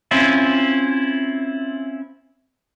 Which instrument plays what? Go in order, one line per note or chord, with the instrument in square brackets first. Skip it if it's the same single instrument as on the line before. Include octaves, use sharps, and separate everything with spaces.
[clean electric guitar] C4 C#4 E4 F4